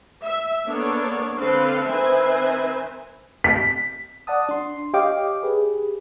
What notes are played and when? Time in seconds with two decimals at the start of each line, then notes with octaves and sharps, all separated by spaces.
0.23 E5
0.68 A#3 B3 D4 A4 C#5 D5
1.38 D3 C4 A4 B4 F5 C6
1.85 D#3 C4 B4 C5 E5 G#5
3.44 B6
4.27 D5 F#5 A5 D#6
4.49 D4 C6
4.94 G4 C#5 D#5 F5 G5 D6
5.43 G4 G#4 B4